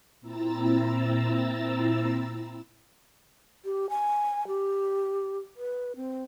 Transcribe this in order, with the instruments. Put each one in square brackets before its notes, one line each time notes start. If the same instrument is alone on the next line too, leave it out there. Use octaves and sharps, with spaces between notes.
[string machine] A#2 C4 E4 A#5 E6 A6
[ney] G4
G#5
G4
B4
C4